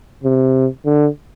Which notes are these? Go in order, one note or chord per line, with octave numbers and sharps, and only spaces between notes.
C3
D3